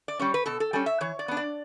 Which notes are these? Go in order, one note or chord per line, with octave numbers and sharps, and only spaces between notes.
D5
G3 C#4 C#5
B4
B2 A4
A4
G3 C#4 A4
E5
E3 C#5
D5
B3 D4
D5